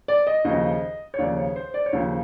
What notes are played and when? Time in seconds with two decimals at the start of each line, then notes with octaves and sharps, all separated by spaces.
0.08 D5
0.27 D#5
0.45 D#2 C#3 F3 D#5
1.14 C#5
1.19 D#2 C#3 F3 D5
1.37 C#5
1.56 C5
1.74 D5
1.86 C#5
1.93 D#2 C#3 F3 C5